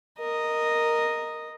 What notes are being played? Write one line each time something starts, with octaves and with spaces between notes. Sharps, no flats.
A#4 D#5